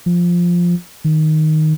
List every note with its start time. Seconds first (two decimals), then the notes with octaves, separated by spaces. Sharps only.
0.06 F3
1.04 D#3